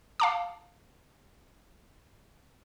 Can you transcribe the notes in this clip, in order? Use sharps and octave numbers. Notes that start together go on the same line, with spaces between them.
F5 A5 D6